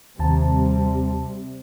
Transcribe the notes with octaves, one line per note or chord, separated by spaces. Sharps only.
D#2 C3 G3 A5